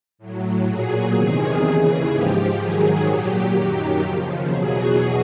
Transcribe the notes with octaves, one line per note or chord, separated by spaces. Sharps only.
A2 F#3
A#2 F#3 G#4
E2 C3 D#3 G#4
D#2 C#3 E3 G#4
G#2 F3 G4
G#2 D#3 F#3 G#4
A#2 F#3 G4
F#2 D#3 F#3
D#2 C#3 F3
E2 B2 F#3 G#4